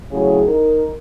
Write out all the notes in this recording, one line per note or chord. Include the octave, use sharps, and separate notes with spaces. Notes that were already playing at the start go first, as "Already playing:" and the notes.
A2 C#3 F#3 G#4
D#4 A#4